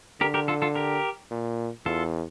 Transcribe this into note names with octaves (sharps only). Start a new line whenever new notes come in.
D3 G4 A#4
G4 A#4
F4 A4
F4 A4
G4 A#4
A#2
E2 F4 A4